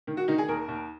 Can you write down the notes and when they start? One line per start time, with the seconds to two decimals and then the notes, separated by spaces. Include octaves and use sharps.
0.07 D#3
0.17 F#4
0.28 D#3 D#4
0.38 G#4
0.48 D#2 A#4
0.68 D#2